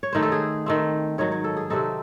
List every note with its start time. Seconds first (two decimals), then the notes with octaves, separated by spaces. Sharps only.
0.03 C#5
0.13 D#3 A3 D#4 C5
0.22 A4
0.32 G#4
0.66 D#3 A3 C4
1.18 G#2 D#3 F#3 C#5
1.32 C#5
1.44 A4
1.57 G#4
1.70 C3 F#3 C4 D#4 A4